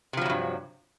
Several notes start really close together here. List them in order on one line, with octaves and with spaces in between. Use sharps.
C3 F3 F#3 E2 G2